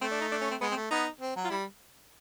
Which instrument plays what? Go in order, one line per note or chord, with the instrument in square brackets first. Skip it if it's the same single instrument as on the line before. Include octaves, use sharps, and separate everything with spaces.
[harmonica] A3 [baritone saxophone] C4
[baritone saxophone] D4
D#4
D4
C#4
C4
[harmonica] G#3 [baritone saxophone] B3
[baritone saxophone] C4
[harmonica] A3
[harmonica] B3 [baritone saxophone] D#4
[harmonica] C4
F#3
[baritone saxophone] F4
[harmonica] G3 [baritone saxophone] E4